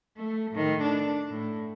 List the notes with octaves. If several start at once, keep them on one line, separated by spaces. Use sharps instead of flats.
A3
A2 D#3
D4
A2